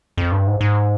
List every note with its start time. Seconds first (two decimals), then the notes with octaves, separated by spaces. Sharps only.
0.17 F2
0.32 G2
0.47 G#2
0.61 G#2